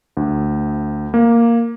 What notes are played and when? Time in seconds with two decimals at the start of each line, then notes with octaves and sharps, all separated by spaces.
0.17 D2
1.14 A#3